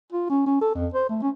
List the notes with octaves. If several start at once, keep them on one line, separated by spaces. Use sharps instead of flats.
F4
C#4
C#4
A4
F2
C5
A3
C#4